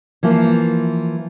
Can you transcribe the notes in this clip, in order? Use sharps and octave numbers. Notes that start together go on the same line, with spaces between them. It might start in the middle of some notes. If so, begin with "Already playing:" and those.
E3 F3 A#3